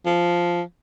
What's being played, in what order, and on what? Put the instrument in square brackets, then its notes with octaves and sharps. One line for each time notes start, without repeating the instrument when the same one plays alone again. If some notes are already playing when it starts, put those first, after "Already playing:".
[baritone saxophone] F3